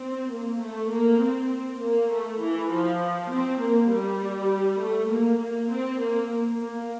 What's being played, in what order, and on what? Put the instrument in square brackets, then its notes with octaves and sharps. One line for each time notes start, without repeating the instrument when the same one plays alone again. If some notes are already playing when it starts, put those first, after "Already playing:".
Already playing: [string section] C4
A#3
A3
A#3
C4
A#3
A3
E3
F3
C4
A#3
G3
A3
A#3
A#3
C4
A#3
A#3